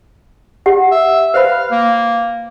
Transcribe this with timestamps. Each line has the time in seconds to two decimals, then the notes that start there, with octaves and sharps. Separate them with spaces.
0.66 G4 F#5
0.92 E5
1.34 B4 C5 F5 B5
1.71 A#3